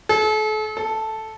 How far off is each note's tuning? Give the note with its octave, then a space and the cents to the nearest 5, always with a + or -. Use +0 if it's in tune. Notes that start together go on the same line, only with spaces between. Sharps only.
A4 -40
A4 -5